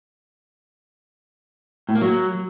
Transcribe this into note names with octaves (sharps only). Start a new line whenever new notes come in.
A2
A#3
F#3